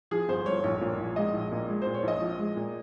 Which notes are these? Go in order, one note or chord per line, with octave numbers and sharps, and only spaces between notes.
F3 G#4
G1 C5
G2 C#5
A#1 C#5
A#2
A#1
G#3 D#5
A#1
A#2
G#3
A#2 C5
C#5
A#1 D#5
F3
G#3
A#2